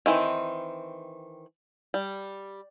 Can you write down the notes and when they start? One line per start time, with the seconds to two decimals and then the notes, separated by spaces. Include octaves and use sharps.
0.06 D#3 E3 C4
1.94 G3